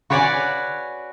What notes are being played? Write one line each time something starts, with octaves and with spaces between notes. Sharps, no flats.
F#4 B4 C#5 D5 F#5 G#5